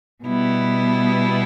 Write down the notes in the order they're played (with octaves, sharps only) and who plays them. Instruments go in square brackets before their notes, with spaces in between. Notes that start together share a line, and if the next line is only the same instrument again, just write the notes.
[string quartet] B2 G3 B3 E4